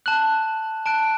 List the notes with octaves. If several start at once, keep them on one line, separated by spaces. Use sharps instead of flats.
A5 F#6 F#7
A5 F#6 D7